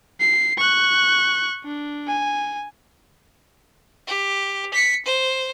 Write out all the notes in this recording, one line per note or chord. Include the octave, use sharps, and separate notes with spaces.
C7
C#6 F#6
D4
G#5
G4
B6 C#7
C5